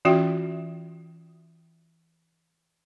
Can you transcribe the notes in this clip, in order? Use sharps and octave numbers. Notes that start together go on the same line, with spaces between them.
E3 C#4 F4 F#4 E5 G5